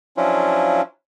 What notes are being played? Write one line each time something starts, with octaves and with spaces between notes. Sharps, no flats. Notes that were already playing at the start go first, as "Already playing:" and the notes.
F3 F#3 C#4 D4 E4 F4